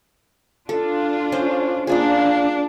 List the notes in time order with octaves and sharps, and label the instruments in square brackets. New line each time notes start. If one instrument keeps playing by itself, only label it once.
[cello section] D4 F4 [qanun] A4
[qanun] C#4 C5 D#5
[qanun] A#3 F4 G#4 [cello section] D4